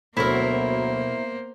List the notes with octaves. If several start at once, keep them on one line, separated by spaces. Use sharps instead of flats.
D2 B2 F#3 A#3 E4 A#4 C5